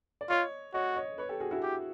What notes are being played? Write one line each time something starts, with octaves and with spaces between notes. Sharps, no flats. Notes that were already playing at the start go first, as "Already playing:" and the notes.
D5
F4 C#5 D#5
F#4 C#5 D#5
C#5 D#5
B4 C#5
G4 A4
F#4 G#4
E4 F#4
G4